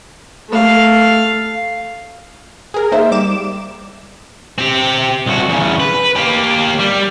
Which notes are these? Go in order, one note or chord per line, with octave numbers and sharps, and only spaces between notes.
A3 F5
G#4 A#4
A#3 D#4 C5 E5
G3 D6 E7
C4 G4
C2 F#4
E2 C#3
B4
A#3 G4
G3